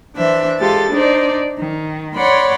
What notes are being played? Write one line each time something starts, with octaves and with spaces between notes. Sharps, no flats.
E3 D4 C5 E5
G#3 F4 G4 A4 A6
D4 D#4 C5 D5
D#3
C#5 D5 F#5 B5 C6